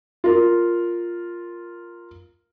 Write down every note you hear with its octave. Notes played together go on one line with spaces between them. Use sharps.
F4 A#4